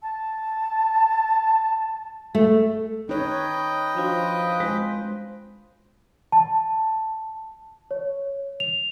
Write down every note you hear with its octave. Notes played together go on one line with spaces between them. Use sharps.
A5
A3
D#4 B4 C#5 D#5 G5
F3 D4 F#4
G#3 F4 C5
A5
C#5
F7